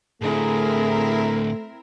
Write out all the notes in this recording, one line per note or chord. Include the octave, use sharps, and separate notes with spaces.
A2 D3 A3 C4 E4 G#4 A#4